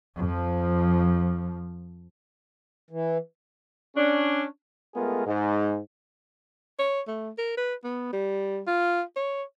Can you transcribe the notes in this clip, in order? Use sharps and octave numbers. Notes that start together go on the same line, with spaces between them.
F2 F3
E3
C#4 D4
G#3 A3 B3 F4 G#4 A#4
G#2
C#5
A3
A#4
B4
B3
G3
F4
C#5